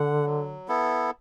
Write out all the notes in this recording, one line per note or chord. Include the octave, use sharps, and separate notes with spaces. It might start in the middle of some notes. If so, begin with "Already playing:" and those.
Already playing: D3 F#5
F#3
B3 E4 A4